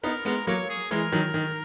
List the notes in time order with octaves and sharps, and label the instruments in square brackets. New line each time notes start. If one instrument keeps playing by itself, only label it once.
[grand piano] B3 D#4 [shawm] A#4
[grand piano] G#3 B3 [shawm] A#4
[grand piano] F#3 A#3 [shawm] C#5
[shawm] G#4
[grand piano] E3 G#3 [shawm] A#4
[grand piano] D#3 F#3
D#3